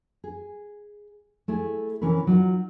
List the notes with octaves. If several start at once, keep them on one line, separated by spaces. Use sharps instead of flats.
G#4
A3 E4 G#4
C3 E3 C#4 A#4 B4
F#3 D#4 F4